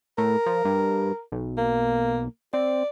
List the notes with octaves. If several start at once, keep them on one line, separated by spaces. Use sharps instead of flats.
A2 A#4
F3
G2
B1
A#3
C4 D5